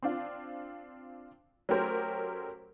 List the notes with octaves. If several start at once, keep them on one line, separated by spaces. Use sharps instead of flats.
C4 D4 F4
F#3 A3 C#4 G4 A#4 C5